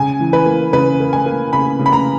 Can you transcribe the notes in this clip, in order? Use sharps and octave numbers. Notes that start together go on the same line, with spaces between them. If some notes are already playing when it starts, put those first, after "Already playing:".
Already playing: C#3 G#5
E3
B4
A#3
C#3 B4
A#3
G#5
A#3
C#3 B5
C#3
B5
A#5